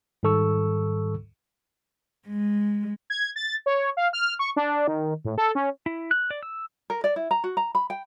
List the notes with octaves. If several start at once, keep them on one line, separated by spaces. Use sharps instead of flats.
G#2 D#3 G3 A4 C#6 E6
G#3
G#6
A6
C#5
F5
F6
C#6
D4
D#3
A2
A4
C#4
E4
F#6
D5
E6
A#4
D5
E4
A#5
F#4
A#5
B5
G5